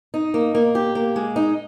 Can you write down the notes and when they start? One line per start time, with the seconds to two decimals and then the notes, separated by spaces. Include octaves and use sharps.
0.14 D#4
0.34 A#3
0.55 A#3
0.75 G4
0.95 A#3
1.16 G#3
1.36 D#4